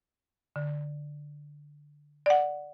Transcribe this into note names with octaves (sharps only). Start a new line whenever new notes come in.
D3
D5 F#5